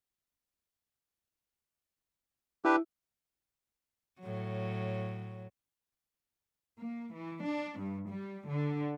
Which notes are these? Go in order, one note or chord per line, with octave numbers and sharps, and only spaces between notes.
D4 E4 G4 B4
A2 F#3
A#3
E3
D4
G2
G3
D3